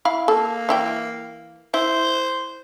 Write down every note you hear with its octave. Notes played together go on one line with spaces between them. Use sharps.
E4 F5 B5
A#3 A4
E3 E4 G5
E4 C5